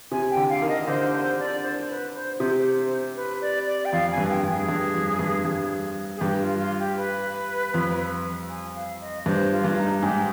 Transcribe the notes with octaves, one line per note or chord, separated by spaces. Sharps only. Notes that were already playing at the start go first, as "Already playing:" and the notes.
C3 G#5
G5
D3
F5
D#3
D#5
D3 C5
C5
D5
C5
B4
C5
C3 C5
C5
C5
B4
D5
D5
G5
F2 F5
G#5
G2
G5
G2
G#4
G2
F2
G2
G2
G#4
G2 G4
F4
F4
G4
B4
F2
G#5
F5
D#5
G2 C5
F4
G2
D#4
G#2 G4